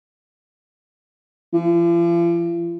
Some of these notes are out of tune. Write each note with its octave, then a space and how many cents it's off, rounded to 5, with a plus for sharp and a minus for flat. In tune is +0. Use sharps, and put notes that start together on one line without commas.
F3 -45